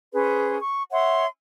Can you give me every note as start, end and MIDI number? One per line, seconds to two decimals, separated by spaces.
0.13 0.57 61
0.13 0.57 68
0.13 0.57 71
0.13 0.57 72
0.60 0.83 85
0.92 1.25 73
0.92 1.25 76
0.92 1.25 78
0.92 1.25 84